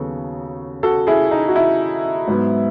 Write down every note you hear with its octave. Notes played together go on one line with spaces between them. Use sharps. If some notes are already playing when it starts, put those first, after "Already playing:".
Already playing: D#2 C#3 F#3 B3 A4
F#4 A4
E4 G#4
D#4
F#4
E4
G#2 F#3 B3